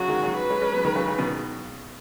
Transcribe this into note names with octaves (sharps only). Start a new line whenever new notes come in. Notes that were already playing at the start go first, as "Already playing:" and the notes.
Already playing: C#3 F#3 F#4
D#3 G#3
C#3 F#3
B4
G#3 C#4
G#3 C#4
F#3 B3
D#3 G#3
C#3 F#3
C#3
B2 D#3